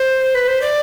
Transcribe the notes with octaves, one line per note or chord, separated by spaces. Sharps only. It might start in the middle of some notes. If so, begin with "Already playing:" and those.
Already playing: C5
B4
C5
D5